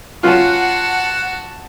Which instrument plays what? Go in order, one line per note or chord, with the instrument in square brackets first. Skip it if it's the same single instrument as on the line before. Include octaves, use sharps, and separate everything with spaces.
[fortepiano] F#3 C#4 F4 [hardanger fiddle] F#4 A5 [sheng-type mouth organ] F#5